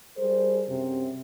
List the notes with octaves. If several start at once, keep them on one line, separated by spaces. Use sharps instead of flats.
G3 G#4 A#4 C5
F#2 C3